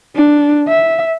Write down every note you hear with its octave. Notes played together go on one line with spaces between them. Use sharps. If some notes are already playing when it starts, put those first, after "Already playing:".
D4
E5